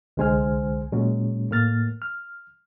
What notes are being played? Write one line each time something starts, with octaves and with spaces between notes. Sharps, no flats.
C2 D3 G#3 C5 G#5 F6
A#2 F#3 G#3 C#4
A2 A#3 F6 A6
F6